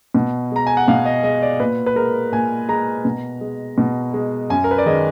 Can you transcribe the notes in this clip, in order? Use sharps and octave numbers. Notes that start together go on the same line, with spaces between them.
B2
G#3 A#5
G#5
F#5
B2 F5
D#5
G#3 D#5
D5
A#2 B4
B4
G#3 A#4
A#2 G#5
G#3 A#5
B2
G#3
B2
G#3
F#2 G#5
A#4
B4
D5
D#3 G#3 D#5